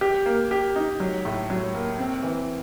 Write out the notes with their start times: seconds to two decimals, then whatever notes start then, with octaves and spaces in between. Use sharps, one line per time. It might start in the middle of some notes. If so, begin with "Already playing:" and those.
0.01 G4
0.26 A#3
0.51 G4
0.76 D#4
1.00 F#3
1.25 A2
1.50 F#3
1.75 A#3
1.99 C4
2.23 E3